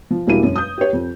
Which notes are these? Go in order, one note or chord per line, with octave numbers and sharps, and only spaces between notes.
F3
E1 G3 A#3 E4 F#4 D#7
F#2
D#6 G6
G4 C#5
F2